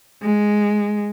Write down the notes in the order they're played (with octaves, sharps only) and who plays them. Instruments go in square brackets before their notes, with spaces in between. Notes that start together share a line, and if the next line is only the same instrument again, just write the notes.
[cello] G#3